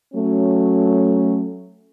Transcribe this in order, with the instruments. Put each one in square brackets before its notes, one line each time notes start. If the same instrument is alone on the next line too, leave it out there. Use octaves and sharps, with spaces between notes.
[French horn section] F#3 A3 C#4